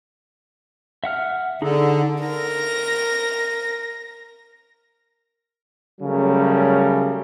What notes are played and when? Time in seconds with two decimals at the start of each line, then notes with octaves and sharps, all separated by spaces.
1.04 E5 F#5 F6
1.62 D3 D#4 G#4
2.24 A#4 A#6
6.01 C#3 F#3 G3 A3 A#4